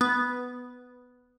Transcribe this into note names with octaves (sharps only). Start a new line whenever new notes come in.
B3